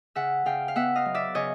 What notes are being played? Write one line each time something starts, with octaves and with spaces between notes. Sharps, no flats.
C#3 E5 F#5
C#3 F5 G5
F5
B3 E5 F#5
D#5 F5
F#3
D5 E5
C#3 C#5 D#5